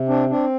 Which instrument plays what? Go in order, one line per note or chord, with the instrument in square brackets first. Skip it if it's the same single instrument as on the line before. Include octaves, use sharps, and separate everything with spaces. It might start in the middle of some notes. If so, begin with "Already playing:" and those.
Already playing: [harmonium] C3
C4 D4
C4 D4